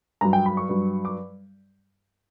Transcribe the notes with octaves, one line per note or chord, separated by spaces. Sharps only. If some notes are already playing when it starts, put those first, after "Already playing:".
G2 F#3 A#5
G5
B5
C#6
G2 F#3
D6